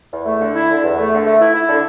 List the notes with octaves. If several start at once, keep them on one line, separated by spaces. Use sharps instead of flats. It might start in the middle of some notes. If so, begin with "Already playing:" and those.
E2
A3
D3
E4
D3
E2
A3
D3
A3
E4
E4
D3